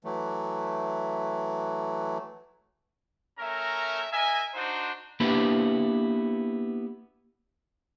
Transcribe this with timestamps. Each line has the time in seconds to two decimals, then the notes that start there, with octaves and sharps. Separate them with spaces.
0.04 E3 F#3 A3
3.38 A3 C#4 A#4 E5 A#5
4.12 A#4 D#5 E5 G#5
4.54 D4 D#4 F#4 C5
5.20 A#3 B3 D4 E4 G4 B4